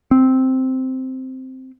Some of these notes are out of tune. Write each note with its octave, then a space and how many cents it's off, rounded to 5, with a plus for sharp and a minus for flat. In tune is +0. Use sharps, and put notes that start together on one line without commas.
C4 -5